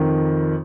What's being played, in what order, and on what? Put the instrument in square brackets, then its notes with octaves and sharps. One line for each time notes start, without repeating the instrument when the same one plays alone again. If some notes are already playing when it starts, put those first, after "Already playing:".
Already playing: [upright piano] F2 D#3